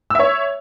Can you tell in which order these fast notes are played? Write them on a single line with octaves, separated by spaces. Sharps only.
E6 E5 C#5